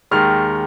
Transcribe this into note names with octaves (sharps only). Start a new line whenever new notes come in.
D#2 D#3 G#3 F6